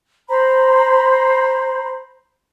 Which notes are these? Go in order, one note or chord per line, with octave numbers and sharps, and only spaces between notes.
C5 A#5 B5